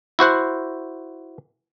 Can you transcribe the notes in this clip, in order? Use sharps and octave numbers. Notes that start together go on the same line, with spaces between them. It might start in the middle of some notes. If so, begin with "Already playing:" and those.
E4 F#4 C5 F#5